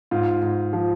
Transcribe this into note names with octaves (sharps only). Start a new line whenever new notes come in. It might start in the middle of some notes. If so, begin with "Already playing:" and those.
G#2 F4
G#2
F3